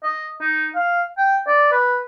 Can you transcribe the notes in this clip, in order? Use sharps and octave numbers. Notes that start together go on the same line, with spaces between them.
D#5
D#4
F5
G5
D5
B4